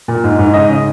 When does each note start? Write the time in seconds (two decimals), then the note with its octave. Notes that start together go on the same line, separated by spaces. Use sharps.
0.08 A#2
0.24 G#2
0.39 G#2
0.54 C#3 D#5
0.69 C#3